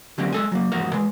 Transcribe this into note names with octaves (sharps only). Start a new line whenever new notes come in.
D3 F#3 G3 A#3 C4 C#4
G#3 A4 G#5
F#3 A3 A#3
E2 G#2 F3 F#4 A#4
E3 G#3